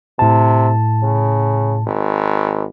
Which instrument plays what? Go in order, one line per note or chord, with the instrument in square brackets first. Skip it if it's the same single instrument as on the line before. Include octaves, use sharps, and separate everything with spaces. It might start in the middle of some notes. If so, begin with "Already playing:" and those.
[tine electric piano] A2 A5 [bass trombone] C3
[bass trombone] C#3
G#1